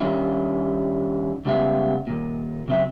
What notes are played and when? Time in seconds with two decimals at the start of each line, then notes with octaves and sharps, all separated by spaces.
0.01 D#3 G3 C#4 D4 E4 F4
1.45 C#2 C#3 G3 B3 E5 F5
2.07 D#2 A#2
2.68 C#3 F#3 C4 D#5 E5